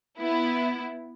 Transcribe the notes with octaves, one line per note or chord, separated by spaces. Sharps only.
B3 E4